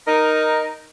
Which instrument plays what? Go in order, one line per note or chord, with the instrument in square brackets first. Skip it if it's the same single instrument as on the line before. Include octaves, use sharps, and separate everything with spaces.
[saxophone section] D#4 A#4